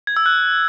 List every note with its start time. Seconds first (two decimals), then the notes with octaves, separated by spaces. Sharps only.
0.07 G#6
0.17 E6
0.26 F#6